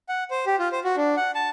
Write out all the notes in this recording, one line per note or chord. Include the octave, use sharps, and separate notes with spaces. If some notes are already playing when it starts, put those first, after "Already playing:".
F#5
C5
G4
F4
C5
F#4
D4
F#5
A5